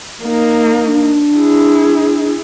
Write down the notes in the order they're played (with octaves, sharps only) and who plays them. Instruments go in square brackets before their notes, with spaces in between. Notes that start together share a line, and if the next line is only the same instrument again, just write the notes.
[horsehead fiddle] A#3 D#4
[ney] D4
[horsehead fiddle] E4 G#4